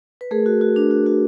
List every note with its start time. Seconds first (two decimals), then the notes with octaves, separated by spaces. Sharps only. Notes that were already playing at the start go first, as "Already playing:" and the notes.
0.21 B4
0.31 A3 G#4 A#4
0.46 F#4
0.61 F#4
0.76 D4
0.91 F#4
1.06 F#4